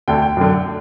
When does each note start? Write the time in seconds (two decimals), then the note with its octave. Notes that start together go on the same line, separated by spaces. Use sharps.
0.08 D2 D3 G5
0.22 G5
0.37 F#2 D3